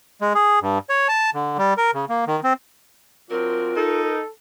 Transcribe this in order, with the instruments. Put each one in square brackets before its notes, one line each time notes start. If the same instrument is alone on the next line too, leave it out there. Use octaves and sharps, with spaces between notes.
[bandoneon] G#3
G#4
G2
C#5
A5
D3
G3
A#4
C#3
A#3
D#3
C4
[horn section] F#3 C4 D4 [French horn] F4 [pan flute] A#4
[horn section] D#4 [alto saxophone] A4